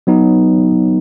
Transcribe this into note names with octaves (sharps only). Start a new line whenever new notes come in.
F#3 B3 D#4